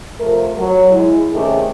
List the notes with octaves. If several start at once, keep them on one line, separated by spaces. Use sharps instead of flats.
C3 F3 A3 A#4
F#3
G#3 E4
C3 D#3 A3 C#4 G4 G#4